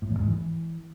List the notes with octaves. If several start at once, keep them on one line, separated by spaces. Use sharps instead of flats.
A2
E2
G#2
E3